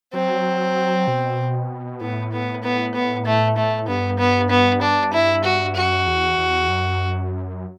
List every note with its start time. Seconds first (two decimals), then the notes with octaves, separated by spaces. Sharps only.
0.13 F#3 C4
1.08 B2
2.01 A2 B3
2.32 B3
2.64 B3
2.94 B3
3.26 A3
3.57 A3
3.88 G2 B3
4.19 B3
4.50 B3
4.81 D4
5.13 E4
5.44 F#4
5.75 F#2 F#4
6.07 E2
6.38 E2
6.69 F#2